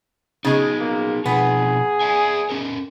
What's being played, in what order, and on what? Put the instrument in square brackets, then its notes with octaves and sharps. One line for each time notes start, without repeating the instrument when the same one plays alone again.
[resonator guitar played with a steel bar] C#3 G#3 [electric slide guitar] B3 D#4
[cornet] A#3
[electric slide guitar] B2 F3 D#4 [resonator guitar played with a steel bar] B3 [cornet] G#4
[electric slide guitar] D5 E5 G#5
C#4 A4 A#4